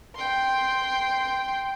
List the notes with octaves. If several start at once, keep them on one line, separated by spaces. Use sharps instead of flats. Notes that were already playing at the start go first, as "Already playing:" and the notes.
G5 C6